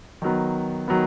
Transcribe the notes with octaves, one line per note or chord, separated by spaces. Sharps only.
D#3 F#3 B3
D#3 F#3 B3